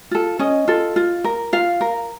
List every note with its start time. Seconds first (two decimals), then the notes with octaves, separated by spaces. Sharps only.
0.11 F4 A4
0.39 C#4 D#5
0.68 F4 A4
0.96 F4
1.24 A#4
1.53 F4 F5
1.81 A#4